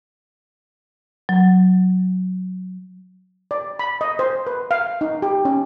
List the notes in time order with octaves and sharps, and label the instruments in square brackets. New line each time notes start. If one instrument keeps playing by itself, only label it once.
[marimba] F#3
[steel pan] D5
B5
D#5
C5
B4
F5
D#4
G4
C#4